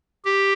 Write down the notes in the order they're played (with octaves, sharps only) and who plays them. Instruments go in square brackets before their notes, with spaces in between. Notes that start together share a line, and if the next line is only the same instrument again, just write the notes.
[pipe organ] G4